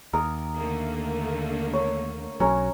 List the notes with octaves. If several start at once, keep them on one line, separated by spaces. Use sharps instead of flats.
D#2 A#4 D#6
D3 A3 A#3
C#5
B1 F#3 C#4 A#4